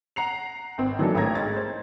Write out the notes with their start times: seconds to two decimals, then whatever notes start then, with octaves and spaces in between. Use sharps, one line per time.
0.16 F#5 A#5 C7 F7
0.78 G#1 C4
0.99 E3 F#3 A#3 D4 D#4 A4
1.15 A1 A3 A#3 A#5 G#6 A#6
1.35 G#2 A6
1.56 C5